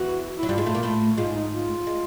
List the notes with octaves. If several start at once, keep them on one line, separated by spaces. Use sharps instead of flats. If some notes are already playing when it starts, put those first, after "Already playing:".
Already playing: E2 E3 F#4
F#3 E4
G2 G3 F4
G#2 G#3
A2 A3
A#2 A#3
A2 A3
G#2 G#3 F4
D#4
F4
G#3